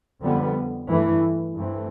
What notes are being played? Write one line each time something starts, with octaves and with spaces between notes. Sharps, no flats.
F2 D3 G3 B3
G2 E3 A3
G2 E3 A3 C4